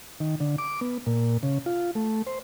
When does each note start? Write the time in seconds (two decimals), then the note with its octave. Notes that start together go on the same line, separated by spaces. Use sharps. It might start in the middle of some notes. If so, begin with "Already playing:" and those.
0.20 D#3
0.40 D3
0.58 D6
0.81 B3
1.07 A#2
1.43 C#3
1.66 F4
1.95 A3
2.27 C5